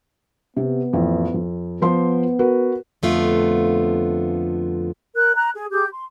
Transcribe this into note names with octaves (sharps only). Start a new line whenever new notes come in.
C3 B3
A1 F2
F2
F3 B3 C5 C6
F#4 A#4 B4
F2 D3 A3 B3 F4
A#4 F#6
A#5 F#6
G#4
G4 G#4 D6 G6
C6